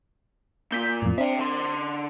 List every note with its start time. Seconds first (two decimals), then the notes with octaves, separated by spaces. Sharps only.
0.72 A#2 G6 B6
1.02 F2 A2
1.18 C4 D4 E5 G5
1.39 D3 C6